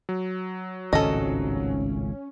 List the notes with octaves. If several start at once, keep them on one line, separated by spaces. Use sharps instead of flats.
F#3
G#1 C#2 A2 C#4 A4 D#5